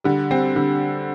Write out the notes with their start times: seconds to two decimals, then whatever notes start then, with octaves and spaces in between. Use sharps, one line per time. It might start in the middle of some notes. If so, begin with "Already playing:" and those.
0.04 D3 G3
0.31 G3 C4
0.56 D3 G3